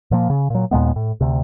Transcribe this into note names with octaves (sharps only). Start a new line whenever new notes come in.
A#2 F3 A#3
C#3
A#2 F#3
D#2 A#2 G#3 B3
A2
D2 C3